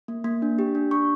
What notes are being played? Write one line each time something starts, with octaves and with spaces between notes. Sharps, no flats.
A#3
A#3
D4
G4
D4
D4 C#6